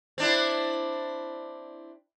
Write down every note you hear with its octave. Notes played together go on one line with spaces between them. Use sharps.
C4 D4 E4